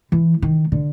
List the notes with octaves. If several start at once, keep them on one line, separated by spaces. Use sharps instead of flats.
E3
D#3
D3